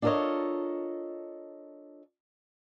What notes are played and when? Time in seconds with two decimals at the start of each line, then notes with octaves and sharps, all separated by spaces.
0.02 D4 F4 A4 A#4 C#5 D#5